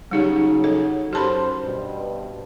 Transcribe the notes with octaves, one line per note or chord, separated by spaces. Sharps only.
C#3 F#3 G3 D#4 G4
A4
F#2 G4 C5 A5 B5
G2 B2